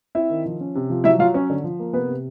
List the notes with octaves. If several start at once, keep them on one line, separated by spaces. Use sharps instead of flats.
C4 E4 E5
D#3
F3
C#4
C3
F3
F#3 E4 E5
F#3 F4 F5
C#4 C#5
D3
F3
A#3
C3 B3 B4
C3